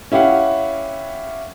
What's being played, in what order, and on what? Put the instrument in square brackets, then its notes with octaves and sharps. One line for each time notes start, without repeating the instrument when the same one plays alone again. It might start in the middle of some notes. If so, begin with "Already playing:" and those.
[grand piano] C#4 E4 G4 F5 F#5